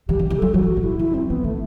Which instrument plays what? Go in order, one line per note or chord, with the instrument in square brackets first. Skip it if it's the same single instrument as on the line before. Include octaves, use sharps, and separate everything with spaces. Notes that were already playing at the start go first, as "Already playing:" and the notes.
[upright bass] E3 [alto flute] G4
[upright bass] D#3
[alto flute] G4
[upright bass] E3
[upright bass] F#3 [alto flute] A4
[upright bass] E3 [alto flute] F#4
[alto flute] F#4
[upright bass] A2
[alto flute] E4
[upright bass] E3 [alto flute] E4
[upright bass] F#3 [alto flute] C4
[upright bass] E3 [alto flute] B3
[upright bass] D#3 [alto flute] A3